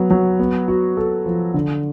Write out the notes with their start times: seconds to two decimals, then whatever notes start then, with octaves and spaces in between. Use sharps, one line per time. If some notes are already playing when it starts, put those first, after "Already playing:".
Already playing: F#3 B3
0.10 F#3
0.39 B3
0.68 F#4
0.97 A4
1.26 F3
1.54 D3